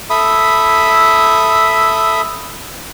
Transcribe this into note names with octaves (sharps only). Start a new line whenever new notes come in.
A4 E5 B5 D#6